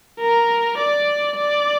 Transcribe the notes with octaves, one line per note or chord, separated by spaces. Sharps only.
A#4
D5
D5